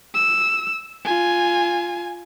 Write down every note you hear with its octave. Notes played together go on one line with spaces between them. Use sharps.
E6
F4 G#5